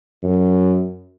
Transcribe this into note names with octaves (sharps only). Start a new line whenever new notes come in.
F#2